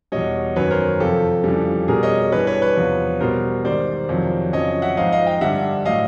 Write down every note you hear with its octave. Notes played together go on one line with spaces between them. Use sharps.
E2 B2 G3 C#5 D#5
F#2 D#3 F#3 B4 C#5
A#4 C5
F2 C3 F3 G4 A4
F2 C#3 E3 G3
B2 G3 G#4 A#4
C#5 D#5
G2 E3 G3 B4 C#5
B4 C#5
B4 C#5
E2 C3 F3
B2 G3 A#4 C5
G#2 D#3 G3 C5 D5
F2 C3 D#3 F#3
F2 C#3 F#3 C#5 D#5
E5 F#5
G#2 F3 D#5 F5
D#5 F5
F5 G5
G2 D3 G3 E5 F#5
A2 F#3 D#5 F5